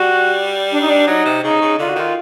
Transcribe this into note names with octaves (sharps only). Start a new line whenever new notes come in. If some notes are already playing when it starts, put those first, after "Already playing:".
Already playing: G3 F#4
D4
D#4
D4
F#3 D#4
C3
C#3 D#4
C#3
D3 F4
F#4
D#3 F4